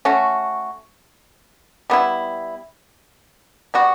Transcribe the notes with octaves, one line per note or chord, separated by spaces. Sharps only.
A3 C#4 F#4
G3 B3 E4
G3 B3 F#4